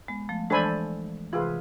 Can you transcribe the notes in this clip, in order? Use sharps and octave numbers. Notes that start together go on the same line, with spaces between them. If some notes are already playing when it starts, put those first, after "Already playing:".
G#3 B3
F3 A3
E3 G#3 D4 A4 C5 G#5 B5
C3 E3 F4 G#4 B4